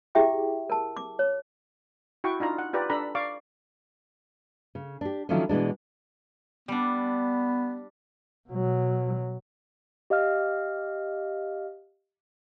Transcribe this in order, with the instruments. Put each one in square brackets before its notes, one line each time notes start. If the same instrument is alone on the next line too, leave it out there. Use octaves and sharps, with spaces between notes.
[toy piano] E4 G4 G#4 E5 G5 D6
A#4 A5
D6
C#5
[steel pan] E4 F#4 G5 C#6
D4 D#4 F4 A#5
F#5
F4 G4 B4 D5 A#5
D4 A4 A#5 B5
D5 F5 C#6 D6
[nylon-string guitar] C#3
D4 G4
D3 D#3 F3 F#3 C#4 E4
B2 E3 G#3 D4
[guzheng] G3 D4 [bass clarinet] B3
[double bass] B2 F#3
[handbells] G4 D#5 F5 F6